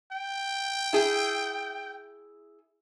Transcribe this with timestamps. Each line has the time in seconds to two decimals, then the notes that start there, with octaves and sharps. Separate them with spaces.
0.12 G5
0.93 E4 G#4